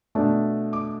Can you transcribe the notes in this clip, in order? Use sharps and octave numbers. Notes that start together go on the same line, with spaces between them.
B2 A3 D4
D6